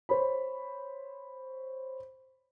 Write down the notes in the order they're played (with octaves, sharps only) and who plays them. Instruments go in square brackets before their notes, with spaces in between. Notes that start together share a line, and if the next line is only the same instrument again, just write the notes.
[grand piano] C5 C#5 B5